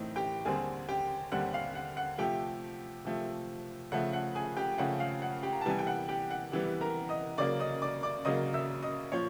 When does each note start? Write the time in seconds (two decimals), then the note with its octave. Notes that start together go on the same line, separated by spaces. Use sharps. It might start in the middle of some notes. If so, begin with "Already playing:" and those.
Already playing: A2 E3 A3 C4 D#4
0.16 G4 G5
0.45 D#2 D3 G3 C4 G#4 G#5
0.89 G4 G5
1.32 D#2 D3 G3 C4 F#5
1.54 F5
1.75 F#5
1.97 F#5
2.18 C3 F3 A3 G4 G5
3.05 C3 F3 A3
3.92 C#3 F3 A3 F#5
4.13 F#5
4.35 G#4 G#5
4.57 G4 G5
4.78 C#3 F3 A3 F#5
5.00 F5
5.22 F#5
5.43 G4 G5
5.53 A#5
5.61 A5
5.65 C3 E3 G3 B3 G#5
5.79 G5
5.87 F#5
6.08 G4 G5
6.31 F#5
6.52 C3 E3 G3 B3
6.81 A#4 A#5
7.09 D#5 D#6
7.38 C#3 F#3 A#3 D5 D6
7.60 D#5 D#6
7.82 D5 D6
8.03 D5 D6
8.25 C#3 F#3 A#3 D#5 D#6
8.54 E5 E6
8.83 D#5 D#6
9.12 A#2 F3 C#5 C#6